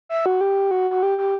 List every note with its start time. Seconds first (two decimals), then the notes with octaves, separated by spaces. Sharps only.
0.09 E5
0.26 F#4
0.41 G4
0.71 F#4
0.91 F#4
1.03 G4
1.18 G4